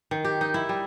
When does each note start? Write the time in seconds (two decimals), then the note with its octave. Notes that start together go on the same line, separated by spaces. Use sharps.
0.11 D#3
0.25 G4
0.41 D#4
0.54 E4
0.69 G3